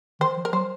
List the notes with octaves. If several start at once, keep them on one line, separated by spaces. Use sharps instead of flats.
D#3 C5
F3
A#4
F#3 C5